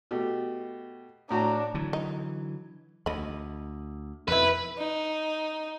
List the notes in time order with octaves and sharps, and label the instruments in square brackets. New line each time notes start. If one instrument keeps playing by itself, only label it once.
[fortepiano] B2 A3 G4
[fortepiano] A2 F#4 [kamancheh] D4 [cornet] A#5
[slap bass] D3 E3 F#3
[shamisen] D#4
[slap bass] D2 [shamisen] D#5 B5
[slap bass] F2 B2 [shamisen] D#4 E4 [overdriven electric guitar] B4
[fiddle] D#4